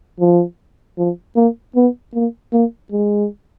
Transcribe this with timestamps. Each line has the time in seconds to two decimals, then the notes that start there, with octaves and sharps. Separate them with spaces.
0.20 F3
0.98 F3
1.36 A#3
1.76 B3
2.14 A#3
2.53 A#3
2.92 G#3